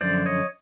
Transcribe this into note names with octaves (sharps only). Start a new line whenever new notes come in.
F#2 D3 F3 C5 D5
C#5 D#5